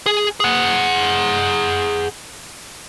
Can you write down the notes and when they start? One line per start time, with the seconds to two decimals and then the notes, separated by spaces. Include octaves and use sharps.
0.06 G#4
0.40 G#4 F#5